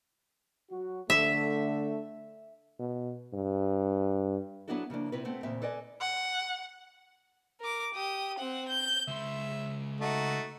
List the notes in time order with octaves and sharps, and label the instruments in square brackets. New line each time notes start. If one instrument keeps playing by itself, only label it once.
[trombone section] F#3 F#4
[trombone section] D3 A3 [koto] E5
[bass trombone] B2
G2
[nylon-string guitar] F#3 B3 D4 E4 F#4 A4
C#3 F3 A#3 D4
C3 C4 E4 F4 B4
A3 B3 C4
E2 A#2 C#3 C4 E5
A4 B4 D5 D#5 G#5
[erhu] F#5
[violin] A#4 D6
G4 D#6
C4 F#5
G6
[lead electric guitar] C#2 C6 [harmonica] E5
[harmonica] A3 D#4 F#4